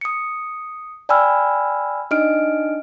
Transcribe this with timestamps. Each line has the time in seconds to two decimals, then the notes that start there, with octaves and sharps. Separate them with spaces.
0.01 D#6 C#7
1.09 D5 G5 G#5 B5 E6 F6
2.11 D4 D#4 D#5 F6 D7